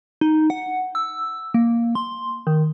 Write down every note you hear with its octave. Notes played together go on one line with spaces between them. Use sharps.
D#4
F#5
E6
A#3
C6
D#3